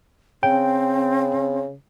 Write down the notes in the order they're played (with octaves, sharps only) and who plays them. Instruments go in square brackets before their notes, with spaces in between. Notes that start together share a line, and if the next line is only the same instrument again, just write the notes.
[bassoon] C#3 [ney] C4 [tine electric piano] G5